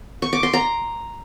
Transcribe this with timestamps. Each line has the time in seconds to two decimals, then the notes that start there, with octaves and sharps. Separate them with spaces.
0.22 C#6
0.33 D6
0.43 C6
0.53 A#5